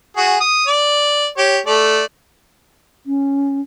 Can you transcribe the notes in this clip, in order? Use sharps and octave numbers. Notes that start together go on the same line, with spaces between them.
F#4 G#4
D#6
D5
G4 C#5
A3 D5
C#4